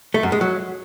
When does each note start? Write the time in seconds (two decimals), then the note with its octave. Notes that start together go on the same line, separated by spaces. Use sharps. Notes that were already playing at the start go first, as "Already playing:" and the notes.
0.14 A3
0.23 F#2
0.32 G#3
0.41 F#3